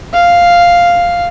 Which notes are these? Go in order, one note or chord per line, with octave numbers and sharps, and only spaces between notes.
F5